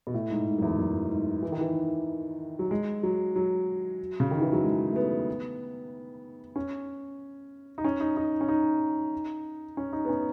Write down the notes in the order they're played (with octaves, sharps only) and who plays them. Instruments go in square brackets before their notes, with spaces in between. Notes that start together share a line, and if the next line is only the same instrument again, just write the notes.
[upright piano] B2
A2
G#2
G#2
F#2
E2
F#2
G#2
E3
D#3
E3
F#3
G#3
F#3
F#3
C#3
D#3
E3
F#3
G#3
A3
B3
C#4
D#4
C#4
D#4
D#4
C#4
D#4
C#4
D#4
B3
C#4